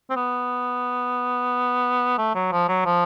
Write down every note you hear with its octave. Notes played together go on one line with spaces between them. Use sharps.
C4
B3
A3
F#3
F3
F#3
F3